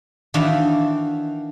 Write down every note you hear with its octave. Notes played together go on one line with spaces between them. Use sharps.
D#3 E3 D4 F#4 E5 F5